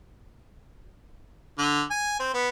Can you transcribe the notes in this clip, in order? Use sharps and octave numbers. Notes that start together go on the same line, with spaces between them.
D3
G#5
C4
B3